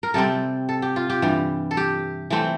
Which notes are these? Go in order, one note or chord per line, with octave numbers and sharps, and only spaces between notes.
A#4
C3 G3 C4 A4
A4
G4
F4
G4
G2 E3 G3
A4
G4
E3 A3 C4